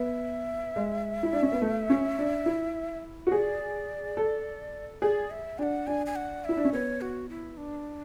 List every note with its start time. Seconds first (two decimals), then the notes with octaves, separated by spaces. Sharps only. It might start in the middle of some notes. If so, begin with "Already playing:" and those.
Already playing: B3 E5
0.76 G#3
1.23 E4
1.33 D4
1.42 C#4
1.52 B3
1.62 A3
1.90 C#4
2.19 D4
2.46 E4
3.27 F#4
3.32 G#4 D5
4.17 A4
5.02 G#4 D5
5.30 E5
5.58 D4 F#5 G#5
5.87 D4 G#5
6.06 G#5
6.16 F#5
6.45 E4 E5
6.57 D4
6.65 C#4
6.73 B3 C#5
7.01 F#4
7.29 E4
7.57 D4